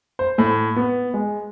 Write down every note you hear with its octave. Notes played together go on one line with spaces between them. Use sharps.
C5
A2
B3
G#3